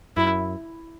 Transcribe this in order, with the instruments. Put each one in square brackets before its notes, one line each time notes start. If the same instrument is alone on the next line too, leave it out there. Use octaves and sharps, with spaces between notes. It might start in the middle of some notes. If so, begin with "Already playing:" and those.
[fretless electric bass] F#2 [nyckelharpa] E4